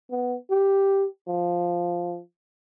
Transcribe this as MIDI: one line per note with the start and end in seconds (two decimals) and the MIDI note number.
0.11 0.36 59
0.50 1.07 67
1.28 2.20 53